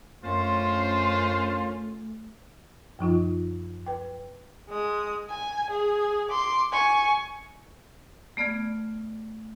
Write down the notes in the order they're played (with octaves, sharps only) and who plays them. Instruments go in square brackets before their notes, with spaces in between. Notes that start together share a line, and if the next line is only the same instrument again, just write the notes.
[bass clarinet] F#2 [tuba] A3 [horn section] C#4 D4 F4 [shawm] C5
[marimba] F#2 F3 D#4 F4
B4 G5
[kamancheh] G#3 D#6
G#5
G#4
C6 D6
G#5 C#6
[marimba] A3 B3 D5 F6 G#6